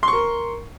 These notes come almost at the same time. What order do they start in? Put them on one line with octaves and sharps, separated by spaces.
C6 C#6 A#4